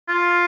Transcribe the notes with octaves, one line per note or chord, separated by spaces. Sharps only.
F4